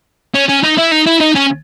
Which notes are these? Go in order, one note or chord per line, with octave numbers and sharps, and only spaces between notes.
C#4
C#4
D#4
E4
D#4
E4
D#4
C#4